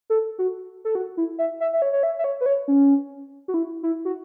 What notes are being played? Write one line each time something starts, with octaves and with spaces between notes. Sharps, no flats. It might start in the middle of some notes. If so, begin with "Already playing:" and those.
A4
F#4
A4
F#4
E4
E5
E5
E5
C#5
C#5
E5
E5
C#5
B4
C#5
C#4
F#4
E4
E4
F#4